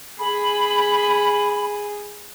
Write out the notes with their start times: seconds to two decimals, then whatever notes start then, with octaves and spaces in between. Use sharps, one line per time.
0.19 G#4 B5